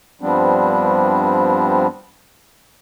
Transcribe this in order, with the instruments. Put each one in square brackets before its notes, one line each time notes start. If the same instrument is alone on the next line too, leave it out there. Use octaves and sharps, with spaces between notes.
[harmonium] G2 F3 G3 B3 C4 D4